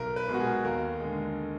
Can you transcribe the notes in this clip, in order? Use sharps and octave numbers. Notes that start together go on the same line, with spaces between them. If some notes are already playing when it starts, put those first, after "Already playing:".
Already playing: B1 A#4
B4
B2 G#3
F#4
G#4
D#2 A#4
D3 G#3